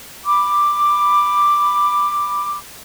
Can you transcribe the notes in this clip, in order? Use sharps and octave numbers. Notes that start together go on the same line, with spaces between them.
B5 D6